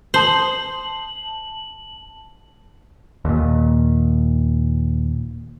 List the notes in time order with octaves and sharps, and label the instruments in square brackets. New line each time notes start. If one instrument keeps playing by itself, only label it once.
[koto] C5 [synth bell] A5 F#7
[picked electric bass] D#2 A#2